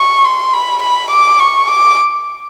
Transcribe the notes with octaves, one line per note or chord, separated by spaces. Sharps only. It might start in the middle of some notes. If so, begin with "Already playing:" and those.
Already playing: C#6
C6
B5
B5
D6
C#6
D6